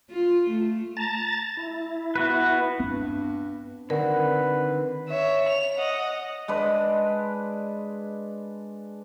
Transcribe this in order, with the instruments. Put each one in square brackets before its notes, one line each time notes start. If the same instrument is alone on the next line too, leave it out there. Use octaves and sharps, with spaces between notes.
[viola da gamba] F4
A3
[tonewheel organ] A5 A#5 A6
E4
[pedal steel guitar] B3 F#4 B4
[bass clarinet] G2 [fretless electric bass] B3 C4
[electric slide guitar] D3 D#3 C4 [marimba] A#4 [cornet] B4 [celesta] D5 F#5
[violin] C#5 E5
F7
D#5 F#5
[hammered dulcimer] G#3 D4 B4